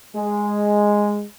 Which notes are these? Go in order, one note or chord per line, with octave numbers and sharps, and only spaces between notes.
G#3